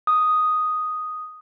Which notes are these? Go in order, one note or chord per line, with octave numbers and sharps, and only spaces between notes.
D#6